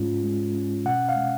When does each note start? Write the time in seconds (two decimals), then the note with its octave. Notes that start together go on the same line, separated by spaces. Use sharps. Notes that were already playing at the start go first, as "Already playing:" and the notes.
Already playing: G#2 G#3 C#4 F4
0.23 G#3
0.55 C#4
0.85 B2 F#5
1.09 F5
1.15 G#3